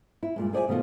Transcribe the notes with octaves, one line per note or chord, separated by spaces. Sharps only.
E4
G2 A#2 G#3
G#4 C5 D5 E5 F#5 G#5
B2 D#3 A3 F4 F#4